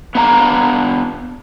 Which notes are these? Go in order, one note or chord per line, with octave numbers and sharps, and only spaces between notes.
B3 D4 F5 A5 A#5